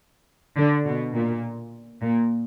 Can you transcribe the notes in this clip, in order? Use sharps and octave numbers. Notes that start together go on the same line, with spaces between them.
D3
B2
A#2
A#2